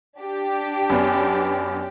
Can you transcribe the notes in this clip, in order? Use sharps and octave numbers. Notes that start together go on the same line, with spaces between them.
D4 G4
F#2 B3 D5